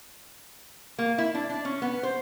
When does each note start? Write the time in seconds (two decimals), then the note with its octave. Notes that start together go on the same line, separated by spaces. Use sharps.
0.99 A#3
1.18 E4
1.34 D4
1.50 D4
1.65 C#4
1.82 B3
2.03 C5